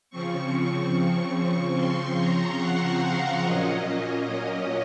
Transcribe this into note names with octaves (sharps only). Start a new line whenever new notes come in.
C#3 F3 C4 C#6
C6
A#5
F#5
F5
A#2 F#3 A#3 C#4 D#5